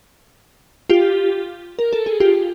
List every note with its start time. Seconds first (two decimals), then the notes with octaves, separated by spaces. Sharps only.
0.90 F4 G4
1.79 A#4
1.93 A4
2.06 G#4
2.20 F4 G4